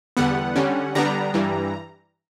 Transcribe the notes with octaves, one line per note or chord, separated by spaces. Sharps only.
E2 D3 G3 B3 F#5
D3 G3 C#4
D3 G3 B3 D4 A#5
G2 E3 G3